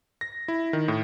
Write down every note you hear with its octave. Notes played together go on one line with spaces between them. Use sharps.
A#6
E4
D#3
A2